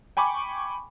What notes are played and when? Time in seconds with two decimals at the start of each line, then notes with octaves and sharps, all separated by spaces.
0.17 G5 G#5 B5 C#6 D6